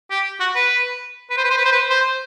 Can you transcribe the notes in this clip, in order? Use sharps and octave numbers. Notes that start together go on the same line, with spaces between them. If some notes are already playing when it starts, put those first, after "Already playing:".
G4
F#4
B4
B4
C5
B4
C5
B4
C5
B4
C5